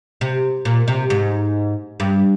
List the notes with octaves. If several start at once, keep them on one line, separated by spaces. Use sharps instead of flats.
C3
A#2
C3
G#2
G2